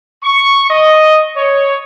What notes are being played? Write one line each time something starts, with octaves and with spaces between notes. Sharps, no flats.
C#6
D#5
C#5